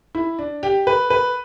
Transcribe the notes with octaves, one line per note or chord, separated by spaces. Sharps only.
E4
D4
G4
B4
B4